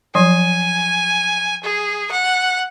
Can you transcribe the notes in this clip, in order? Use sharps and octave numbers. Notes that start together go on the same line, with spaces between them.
F3 F#3 G#5
G#4
F#5